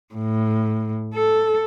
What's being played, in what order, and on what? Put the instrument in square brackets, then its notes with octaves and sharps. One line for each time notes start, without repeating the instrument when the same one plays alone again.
[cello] A2
A4